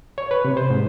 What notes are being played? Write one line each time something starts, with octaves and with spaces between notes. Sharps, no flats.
C#5
B4
C3
C5
G#2